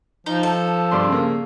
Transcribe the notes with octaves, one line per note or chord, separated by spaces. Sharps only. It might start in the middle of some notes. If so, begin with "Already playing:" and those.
F3 D#4
A4
G2 D5 C6
C#3 A#3